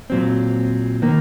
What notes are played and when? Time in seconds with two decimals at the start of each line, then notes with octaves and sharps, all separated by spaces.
0.10 A#2 F#3 C4
1.02 D#3 A#3